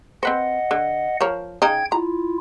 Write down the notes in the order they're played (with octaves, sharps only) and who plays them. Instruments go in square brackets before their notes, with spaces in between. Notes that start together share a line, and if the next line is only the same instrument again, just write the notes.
[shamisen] C4 B4 C5 [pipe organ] D#5 F#5
[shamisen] D3
F3 A#4 C#5
[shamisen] C#3 D#4 [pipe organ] G5 G#6
[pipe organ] E4 F4 [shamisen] A#5